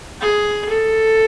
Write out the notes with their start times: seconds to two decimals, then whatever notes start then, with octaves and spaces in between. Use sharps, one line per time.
0.21 G#4
0.69 A4